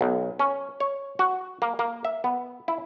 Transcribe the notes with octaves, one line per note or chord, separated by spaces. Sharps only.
B1
C#4
C#5
F#4
A#3
A#3
E5
B3
E4